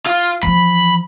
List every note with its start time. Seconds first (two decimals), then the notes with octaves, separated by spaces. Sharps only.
0.07 F4
0.43 E3 F3 B5